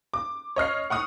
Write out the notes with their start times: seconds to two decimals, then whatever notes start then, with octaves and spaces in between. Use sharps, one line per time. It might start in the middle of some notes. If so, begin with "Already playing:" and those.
0.14 D6
0.56 C#5 D#5 F6 C7
0.90 F#5 C#6 D#6 F6